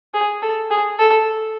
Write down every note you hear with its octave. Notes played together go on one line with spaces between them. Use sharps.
G#4
A4
G#4
A4